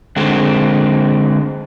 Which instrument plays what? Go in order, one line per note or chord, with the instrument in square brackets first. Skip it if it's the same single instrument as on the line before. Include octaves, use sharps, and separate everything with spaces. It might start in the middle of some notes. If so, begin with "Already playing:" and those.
[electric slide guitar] D3 G#3 C4